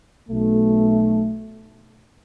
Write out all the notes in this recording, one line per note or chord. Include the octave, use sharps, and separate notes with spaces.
B1 B2 A3